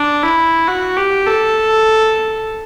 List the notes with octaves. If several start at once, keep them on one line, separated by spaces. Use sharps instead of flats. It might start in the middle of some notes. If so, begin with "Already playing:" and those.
Already playing: D4
E4
F#4
G4
A4